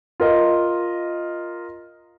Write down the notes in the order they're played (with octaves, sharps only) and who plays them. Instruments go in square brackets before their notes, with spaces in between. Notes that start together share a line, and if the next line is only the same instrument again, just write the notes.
[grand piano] F4 A#4 D#5